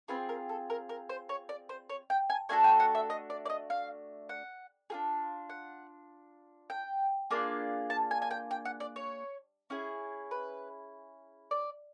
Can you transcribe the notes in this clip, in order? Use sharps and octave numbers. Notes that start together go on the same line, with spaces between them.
C4 F4 G#4 B4
A#4
A4
A#4
A#4
C5
C#5
D5
C5
C#5
G5
G#5
A3 D4 F#4 A4 G#5
G5
F#5
E5
D#5
D5
D5
D#5
F5
F#5
D4 F4 G#4
F#5
G5
A#3 D4 F4 G#4
A5
G#5
G#5
G5
G5
F#5
D5
C#5
C#4 E4 G#4
B4
D5